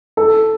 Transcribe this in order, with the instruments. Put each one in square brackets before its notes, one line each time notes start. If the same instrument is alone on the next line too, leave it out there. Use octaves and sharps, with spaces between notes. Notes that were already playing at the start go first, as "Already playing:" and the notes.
[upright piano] A4